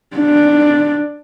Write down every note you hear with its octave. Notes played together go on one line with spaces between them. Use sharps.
D4